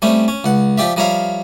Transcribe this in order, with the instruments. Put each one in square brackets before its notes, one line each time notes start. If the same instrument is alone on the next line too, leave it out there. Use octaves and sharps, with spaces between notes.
[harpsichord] G3 A3 C4 C#4
C#4
C#2 F#5
F3 G4 D5 E5
F3 G3 A#4 C#5 E5 F5